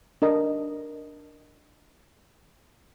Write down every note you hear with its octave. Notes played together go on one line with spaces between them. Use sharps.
D4 A#4 D#5